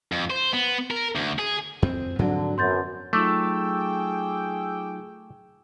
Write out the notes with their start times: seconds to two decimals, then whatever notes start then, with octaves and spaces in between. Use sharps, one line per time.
0.12 F2
0.30 C5
0.53 B3
0.91 A#4
1.16 D2
1.39 G#4
1.82 F2 C4
2.19 G#2 D3 F3 F#3 C4
2.58 F#2 B3 C6 G6 A6
3.13 F#3 A3 D#4 F4 G#4 G5 D6 E6